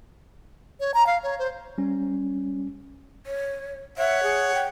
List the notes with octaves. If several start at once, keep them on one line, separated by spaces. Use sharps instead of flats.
C#5
A#5
F5
C#5
C5
G3 C#4
C#5
C#5 E5 F#5
G#4
G5